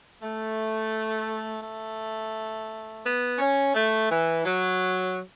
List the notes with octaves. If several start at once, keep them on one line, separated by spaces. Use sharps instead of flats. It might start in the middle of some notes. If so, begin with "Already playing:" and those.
A3
A3
B3
C#4
A3
E3
F#3